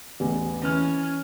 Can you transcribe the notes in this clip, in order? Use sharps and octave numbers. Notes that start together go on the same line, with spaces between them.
A1 E2
E3 C#4 F6